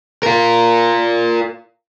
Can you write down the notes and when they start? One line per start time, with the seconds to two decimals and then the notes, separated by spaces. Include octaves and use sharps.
0.23 F4 A#4